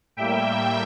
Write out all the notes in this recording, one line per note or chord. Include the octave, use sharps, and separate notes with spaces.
A2 G3 A#3 E5 G5